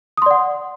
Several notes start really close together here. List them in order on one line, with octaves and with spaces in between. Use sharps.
D#6 C6 D5 F#5